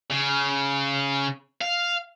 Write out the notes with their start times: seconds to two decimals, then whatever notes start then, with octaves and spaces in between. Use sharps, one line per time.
0.10 C#3
1.61 F5